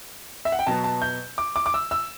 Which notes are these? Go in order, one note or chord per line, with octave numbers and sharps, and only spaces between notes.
E5
F#5
G5
B2 F#3 B3 A5
A5
G6
D6
D6
D6
E6
E6